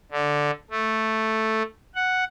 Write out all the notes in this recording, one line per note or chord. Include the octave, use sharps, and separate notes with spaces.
D3
A3
F#5